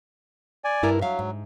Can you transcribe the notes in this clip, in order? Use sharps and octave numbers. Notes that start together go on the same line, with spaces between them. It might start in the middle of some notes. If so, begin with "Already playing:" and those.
D5 G#5
G2 E4 A#4
F#3 E5 F5
G#2